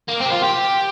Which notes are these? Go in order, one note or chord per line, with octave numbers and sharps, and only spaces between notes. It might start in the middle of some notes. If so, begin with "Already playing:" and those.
A#3
C4
G4
F4
G4